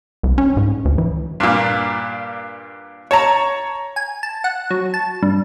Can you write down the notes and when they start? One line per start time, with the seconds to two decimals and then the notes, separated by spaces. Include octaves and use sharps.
0.23 C2
0.38 C#4
0.57 G#2
0.85 D2
0.98 E3
1.40 G2 A#2
3.11 C#5 A5 A#5
3.96 G#5
4.23 A5
4.44 F#5
4.71 F#3
4.94 A5
5.22 G2